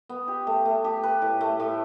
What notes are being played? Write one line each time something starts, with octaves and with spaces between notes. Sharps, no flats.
B3
G4
A3
A3
G4
B4
A2
A3
A2